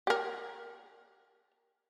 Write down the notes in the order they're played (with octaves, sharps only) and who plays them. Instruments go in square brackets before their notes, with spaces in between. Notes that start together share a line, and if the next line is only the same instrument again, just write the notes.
[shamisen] G4 A#4